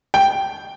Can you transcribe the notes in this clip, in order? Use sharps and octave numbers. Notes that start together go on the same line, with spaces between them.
G5